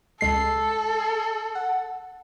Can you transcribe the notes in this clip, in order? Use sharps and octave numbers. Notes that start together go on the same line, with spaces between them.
C#2 G#3 A4 C7
F#5